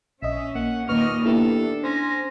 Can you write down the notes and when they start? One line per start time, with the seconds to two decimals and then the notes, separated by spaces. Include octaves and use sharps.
0.23 A#1 C#4 D#5 E5
0.55 A#3 F#5
0.89 D#2 A#2 B4 D#5 C#6 F6
1.25 A#3 B3 D4 E4 G4 A4
1.83 C#4 C5 C6 A#6